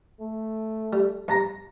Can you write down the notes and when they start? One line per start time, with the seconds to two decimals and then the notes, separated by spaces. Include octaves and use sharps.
0.20 A3
0.93 G3
1.28 G2 A5 A#5